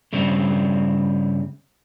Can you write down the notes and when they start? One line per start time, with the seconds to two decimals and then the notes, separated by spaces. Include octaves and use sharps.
0.13 G2 C#3 G3 C4